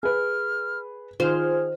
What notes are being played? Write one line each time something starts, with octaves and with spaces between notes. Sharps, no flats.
G#4 B4 F6
D#3 F4 G#4 C5 F6